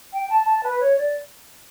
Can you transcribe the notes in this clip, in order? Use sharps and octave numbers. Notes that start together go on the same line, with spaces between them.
G5
A5
A5
B4
C#5
D5